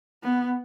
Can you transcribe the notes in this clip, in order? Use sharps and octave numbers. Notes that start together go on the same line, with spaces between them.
B3